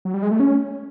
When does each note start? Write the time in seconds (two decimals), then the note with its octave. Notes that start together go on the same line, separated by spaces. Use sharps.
0.05 F#3
0.14 G3
0.22 G#3
0.31 A3
0.40 C#4